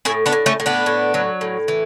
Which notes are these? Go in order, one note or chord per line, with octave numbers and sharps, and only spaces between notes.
A2 E4 G#4
B3 D4
A2
A3 C#4
A2
B3 D4
A2
F#3
A2
E3